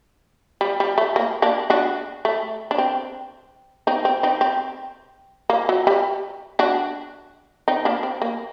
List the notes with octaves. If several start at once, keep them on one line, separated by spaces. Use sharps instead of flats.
G3
G3
A3
A#3
A#3 D4
D4 F#4
A3
D4
C4
C4 D#4
C4
C4 D#4
C4
A#3
F#3
G3
D4 F#4
C4 D#4
A#3 D4
C4
A#3